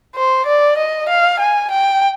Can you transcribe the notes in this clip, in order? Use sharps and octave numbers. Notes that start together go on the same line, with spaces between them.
C5
D5
D#5
F5
G#5
G5